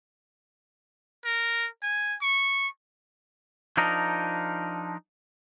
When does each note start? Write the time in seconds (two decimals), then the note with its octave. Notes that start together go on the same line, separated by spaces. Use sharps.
1.25 A#4
1.83 G#5
2.22 C#6
3.77 F3 D4 D#4 A#4